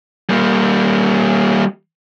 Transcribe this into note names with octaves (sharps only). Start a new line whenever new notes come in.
G3 A#3